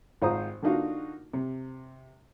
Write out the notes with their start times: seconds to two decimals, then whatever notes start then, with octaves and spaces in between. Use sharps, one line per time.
0.22 G#1 F4 C5 A#5 D#6
0.62 D3 A#3 D4 D#4 F4 F#4
1.33 C3